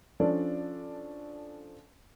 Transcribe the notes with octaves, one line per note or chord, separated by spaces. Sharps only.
F3 C#4 D4 A4 D5